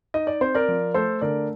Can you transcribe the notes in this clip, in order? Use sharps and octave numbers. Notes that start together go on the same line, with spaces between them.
D#4 D#5
D5
C4 C5
A#4 D5
F3
A3 A4 C5
D3 A#4 D5